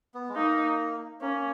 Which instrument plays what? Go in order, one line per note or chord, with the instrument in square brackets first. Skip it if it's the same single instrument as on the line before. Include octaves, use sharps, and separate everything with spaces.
[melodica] B3
G#3
[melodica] A#3 [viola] D#4
[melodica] A#3 [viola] C#4